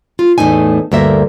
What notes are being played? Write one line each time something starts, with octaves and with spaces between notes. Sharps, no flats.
F4
E2 A2 A3 D#4 G#5
D2 G2 A#3 A#4 E5